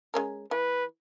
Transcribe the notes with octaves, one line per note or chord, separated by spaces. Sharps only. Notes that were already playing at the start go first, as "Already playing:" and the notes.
G#3 C#4 A#4
E3 B4